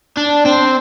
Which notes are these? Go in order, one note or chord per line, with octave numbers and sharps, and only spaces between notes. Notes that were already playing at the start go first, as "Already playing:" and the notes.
D4
C4